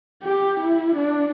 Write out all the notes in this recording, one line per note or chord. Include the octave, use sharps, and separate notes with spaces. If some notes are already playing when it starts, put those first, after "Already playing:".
G4
E4
D4